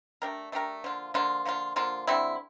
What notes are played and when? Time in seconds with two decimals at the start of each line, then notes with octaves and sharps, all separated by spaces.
0.22 A3 D4 G4 A#4
0.52 A3 D4 G4 A#4
0.84 D3 F3 A#3 F4
1.14 D3 F3 A#3 F4
1.45 D3 F3 A#3 F4
1.76 D3 F3 A#3 F4
2.07 D3 G3 C4 E4